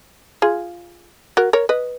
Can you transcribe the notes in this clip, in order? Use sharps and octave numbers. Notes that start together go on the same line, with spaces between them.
F4 G#4
F#4 A#4
A#4 C#5
B4 D#5